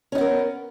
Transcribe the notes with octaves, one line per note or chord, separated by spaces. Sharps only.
B3 C#4 D#4 A#4